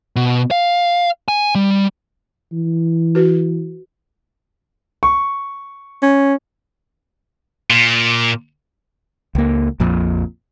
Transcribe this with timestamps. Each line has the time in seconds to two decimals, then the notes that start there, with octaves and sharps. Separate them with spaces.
0.16 B2
0.51 F5
1.28 G#5
1.55 G3
2.53 E3
3.15 F#4 B4
5.03 C#6
6.02 C#4
7.70 A#2
9.35 C#2 A#3
9.80 A#1 F2 A#2